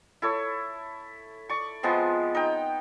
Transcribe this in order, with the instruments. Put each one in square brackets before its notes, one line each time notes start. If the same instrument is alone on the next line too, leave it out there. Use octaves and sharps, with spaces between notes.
[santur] E4 A4 C#5
D5 C#6
F3 G#3 B3 C4
D#4 G5